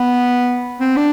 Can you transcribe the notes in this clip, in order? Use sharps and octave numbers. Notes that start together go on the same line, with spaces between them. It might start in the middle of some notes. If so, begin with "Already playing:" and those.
Already playing: B3
C4
D4